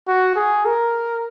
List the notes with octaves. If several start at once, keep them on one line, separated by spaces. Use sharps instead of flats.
F#4
G#4
A#4